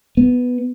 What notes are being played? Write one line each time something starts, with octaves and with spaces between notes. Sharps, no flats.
B3